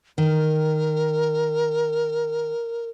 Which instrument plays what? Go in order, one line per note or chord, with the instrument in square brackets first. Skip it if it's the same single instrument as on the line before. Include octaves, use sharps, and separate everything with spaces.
[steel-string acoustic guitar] D#3 [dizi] A#4